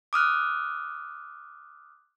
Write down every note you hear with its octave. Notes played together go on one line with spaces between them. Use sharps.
D6 D#6 F6 F#6